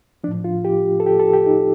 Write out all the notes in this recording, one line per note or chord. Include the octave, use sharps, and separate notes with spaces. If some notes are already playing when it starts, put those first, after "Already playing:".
A2 F3 D4
F4
G4
A4
G4
A4
G4
D#4